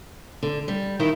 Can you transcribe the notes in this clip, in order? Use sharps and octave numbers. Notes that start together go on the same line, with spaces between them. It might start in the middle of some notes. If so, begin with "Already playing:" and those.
D3
G3
D#3 D#4 E4